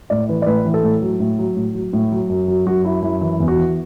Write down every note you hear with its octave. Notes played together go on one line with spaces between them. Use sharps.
A2 D5
E3 B4
D5
A2 B4
E3
A4
A2
F#3
A2
F#3
A2
F#3
A2
F#3
F#2
F#3
F#2 F#4
F#3 E4
F#2 E4
E3 E4
E2
F#4
E3